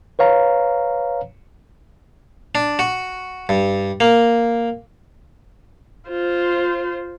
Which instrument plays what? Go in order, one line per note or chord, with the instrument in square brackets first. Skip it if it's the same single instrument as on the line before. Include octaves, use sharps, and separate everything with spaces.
[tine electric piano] B4 C#5 F5 A#5
[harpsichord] D4
F#4
G2
A#3
[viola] F4 C5